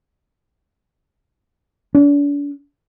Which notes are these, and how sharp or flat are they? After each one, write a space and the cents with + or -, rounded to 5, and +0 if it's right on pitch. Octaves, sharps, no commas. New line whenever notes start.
D4 -40